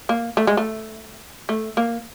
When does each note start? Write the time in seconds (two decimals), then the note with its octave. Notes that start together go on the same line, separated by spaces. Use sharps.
0.09 A#3
0.37 A3
0.47 G#3
0.57 A3
1.49 A3
1.77 A#3